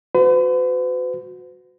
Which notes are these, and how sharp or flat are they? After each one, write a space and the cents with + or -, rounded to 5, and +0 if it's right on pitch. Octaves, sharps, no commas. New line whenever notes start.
F#4 -20 B4 +45